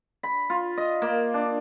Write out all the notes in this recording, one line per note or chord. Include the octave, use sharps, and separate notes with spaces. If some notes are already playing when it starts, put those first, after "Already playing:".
B5
F4
D#5
A#3
D4